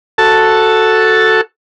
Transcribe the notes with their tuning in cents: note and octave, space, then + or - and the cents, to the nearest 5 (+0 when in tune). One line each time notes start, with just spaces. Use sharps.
F#4 +0 A4 +0 A5 +0